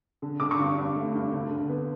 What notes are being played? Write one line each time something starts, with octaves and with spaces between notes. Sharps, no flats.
D3
D3 D6
C#6
G2
G2
A3
G2
D2
D3
B3